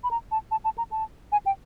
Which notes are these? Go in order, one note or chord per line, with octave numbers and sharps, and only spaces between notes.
B5
A#5
A5
A5
A5
A#5
A5
G#5
G5